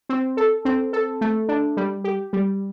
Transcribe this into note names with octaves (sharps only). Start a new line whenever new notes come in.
C4
A4
C4
A4
A3
D4
G3
G4
G3